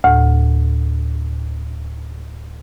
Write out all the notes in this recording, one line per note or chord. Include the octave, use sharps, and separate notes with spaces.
D2 A2